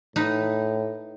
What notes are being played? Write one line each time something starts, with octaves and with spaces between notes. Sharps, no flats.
A2 D#4 B4